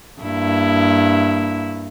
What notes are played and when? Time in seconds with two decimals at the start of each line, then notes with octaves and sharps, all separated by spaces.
0.21 G2 A#3 E4